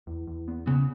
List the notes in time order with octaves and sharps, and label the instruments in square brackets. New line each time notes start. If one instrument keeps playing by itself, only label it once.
[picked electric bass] E2
E2
B3
[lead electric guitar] C#3 [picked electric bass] B3